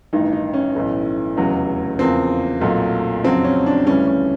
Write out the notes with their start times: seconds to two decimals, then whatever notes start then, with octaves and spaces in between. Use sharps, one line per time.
0.13 A1 G2 D#3 D#4
0.32 D#4
0.54 C#4
0.75 B1 A2 E3 A3
1.37 F1 E2 C#3 F#3
1.99 E2 C#3 F3 A#3 C4
2.61 B1 A#2 F#3 A3
3.24 F2 C#3 F#3 C4
3.44 C#4
3.66 D4
3.86 D2 C#3 E3 G3 C#4
4.07 C#4